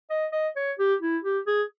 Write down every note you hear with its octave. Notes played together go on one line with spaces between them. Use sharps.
D#5
D#5
C#5
G4
E4
G4
G#4